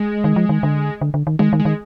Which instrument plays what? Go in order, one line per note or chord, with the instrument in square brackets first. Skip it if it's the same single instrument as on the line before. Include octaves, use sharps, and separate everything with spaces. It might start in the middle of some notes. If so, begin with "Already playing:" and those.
Already playing: [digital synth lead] G#3
[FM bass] D#3
F3
D#3
D3
D3
D3
D#3
[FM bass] D#3 [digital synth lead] G#3
[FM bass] D#3
[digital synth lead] G#3
[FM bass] D#3